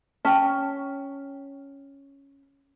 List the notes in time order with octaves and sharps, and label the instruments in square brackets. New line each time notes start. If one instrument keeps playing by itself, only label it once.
[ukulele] C#4 [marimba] G5 A5